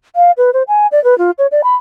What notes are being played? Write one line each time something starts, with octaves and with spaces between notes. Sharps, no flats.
F5
B4
C5
G#5
D5
B4
F4
C#5
D5
B5